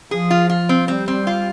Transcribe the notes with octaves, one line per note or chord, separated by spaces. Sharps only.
F3 G#4
F4
F4
C4
G3 C4
C4
F4